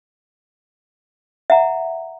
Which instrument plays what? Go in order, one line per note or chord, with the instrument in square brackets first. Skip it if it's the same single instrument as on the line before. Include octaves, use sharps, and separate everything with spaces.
[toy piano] E5 F#5 A#5